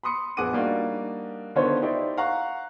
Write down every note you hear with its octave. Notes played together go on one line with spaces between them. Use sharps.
B5 C6 D#6 C#7
A#1 B3 G#4 F#5 D6 D#7
G3 A#3 D4 D#4 F#4
D3 D#3 B3 F4 C5 C#5
D#4 E4 G4 C5 D5
F5 F#5 A#5 C#6 F#6